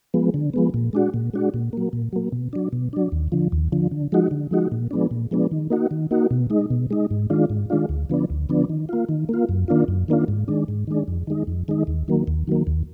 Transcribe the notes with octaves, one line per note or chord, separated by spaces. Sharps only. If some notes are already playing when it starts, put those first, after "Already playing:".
F3 G#3 B3
D3
F3 G#3 B3
A#2
G#3 D4 F#4
A#2
G#3 D4 F#4
A#2
F#3 A#3
A#2
F#3 A#3
B2
F#3 D4
B2
F#3 D4
D#2
D3 F3
D#2
D3 F3
D3
F3 G#3 D#4 F#4
D3
F3 G#3 D#4 F#4
A#2
F3 G#3 B3 D4
A#2
F3 G#3 B3 D4
D#3
A#3 D#4 F#4
D#3
A#3 D#4 F#4
B2
G#3 D#4
B2
G#3 D#4
G#2
D#3 G#3 D4 F4
G#2
D#3 G#3 D4 F4
D2
D3 F3 B3 D4
D2
D3 F3 B3 D4
D#3
A#3 F4
D#3
A#3 F4
F#2
D#3 A#3 D4 F4
F#2
D#3 A#3 D4 F4
G#2
D#3 G#3 D4
G#2
D#3 G#3 D4
F2
D#3 G#3 D#4
F2
D#3 G#3 D#4
D#2
D#3 F#3 A#3
D#2
D#3 F#3 A#3
D#2